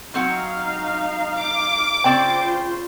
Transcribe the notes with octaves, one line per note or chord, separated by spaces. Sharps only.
F#3 C4 D#4 F5 F#5
D6
C#3 C4 F4 C5 D5 G5